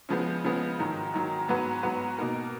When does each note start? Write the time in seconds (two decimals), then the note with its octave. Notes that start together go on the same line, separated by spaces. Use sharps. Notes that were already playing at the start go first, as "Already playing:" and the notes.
0.09 C#3 F3 G#3 B3
0.44 C#3 F3 G#3 B3
0.79 G#2 D#3 F#3
1.13 G#2 D#3 F#3
1.48 G#2 F#3 B3 F#4 B4
1.83 G#2 F#3 B3 F#4 B4
2.18 B2 A#3 D#4 A#4